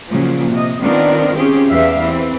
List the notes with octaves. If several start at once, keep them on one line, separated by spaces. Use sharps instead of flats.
A#2 C#3 F3 F#3
C3 D#5
D#3 B3 C4 D4 F4 A#4
C4 C#4 F4 G4 G#4
E2 E3 G4 E5 F5
E3 C4